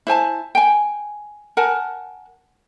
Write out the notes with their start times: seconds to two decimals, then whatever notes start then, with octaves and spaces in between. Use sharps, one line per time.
0.07 E4 C5 G#5 A5
0.55 G5 G#5
1.57 A#4 F#5 G#5 A5